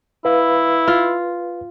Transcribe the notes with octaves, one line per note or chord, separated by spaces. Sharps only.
E4 B4 F5
F4